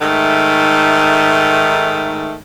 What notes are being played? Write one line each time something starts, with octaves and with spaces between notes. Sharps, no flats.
G#2 D#3 A3